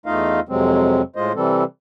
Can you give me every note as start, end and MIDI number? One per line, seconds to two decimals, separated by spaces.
0.06 0.40 40
0.06 0.40 57
0.06 0.40 63
0.06 0.40 65
0.06 0.40 75
0.06 0.40 77
0.49 1.02 41
0.49 1.02 48
0.49 1.02 54
0.49 1.02 56
0.49 1.02 60
1.16 1.33 45
1.16 1.33 56
1.16 1.33 65
1.16 1.33 72
1.16 1.33 75
1.35 1.64 48
1.35 1.64 52
1.35 1.64 55
1.35 1.64 60
1.35 1.64 69